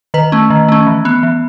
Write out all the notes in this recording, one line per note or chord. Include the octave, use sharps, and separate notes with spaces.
D#3 B4
A3 C#4
D#3
A3 C#4
E3
B3
E3